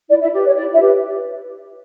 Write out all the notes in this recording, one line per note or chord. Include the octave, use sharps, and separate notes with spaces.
E4 D5
E4 E5
G4 B4 D5
C#5
E4 D5
E4 E5
G4 B4